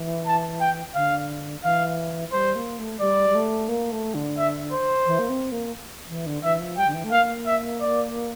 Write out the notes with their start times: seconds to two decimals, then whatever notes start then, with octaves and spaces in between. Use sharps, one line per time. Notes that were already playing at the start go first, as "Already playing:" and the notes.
Already playing: E3
0.27 A5
0.61 G5
0.95 D3 F5
1.63 E3 F5
2.32 G3 C5
2.55 A#3
2.78 A3
3.00 G3 D5
3.30 G3
3.35 A3
3.69 A#3
3.92 A3
4.14 D3
4.38 E5
4.72 C5
5.06 E3
5.19 A#3
5.29 C4
5.52 A#3
6.08 E3
6.26 D3
6.43 E3 E5
6.60 F3
6.78 G3 G5
6.87 D3
6.94 E3
7.04 A3
7.11 A#3 F5
7.46 E5
7.80 D5